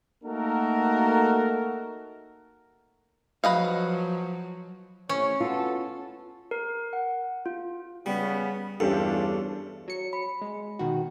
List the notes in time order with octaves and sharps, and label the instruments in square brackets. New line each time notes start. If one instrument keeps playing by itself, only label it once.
[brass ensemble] A3 A#3 D#4 F#4 A4 A#4
[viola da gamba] F3 F#3 [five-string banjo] B4 D#5 F5
[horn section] A2 C3 C#5 [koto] C#4
[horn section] B3 F#4 A4 [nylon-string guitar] F4
[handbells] A#4
F#5
F4
[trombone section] C#3 B3 [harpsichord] G3
[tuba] E2 [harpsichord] G2 [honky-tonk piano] C#4 G4 A4 [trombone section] D4 F4
[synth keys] F#3 C#7
[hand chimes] B5
[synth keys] G#3
B2 D#3 F#4